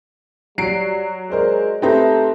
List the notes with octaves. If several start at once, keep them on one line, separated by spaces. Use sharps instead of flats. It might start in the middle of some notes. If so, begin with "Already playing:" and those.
F#3 G3 C7 D7
G#3 A#4 C5 D5
A3 C4 D#4 G4 B4 A#5